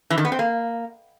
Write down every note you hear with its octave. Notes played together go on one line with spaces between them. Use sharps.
E3
D#3
B3
C4
A#3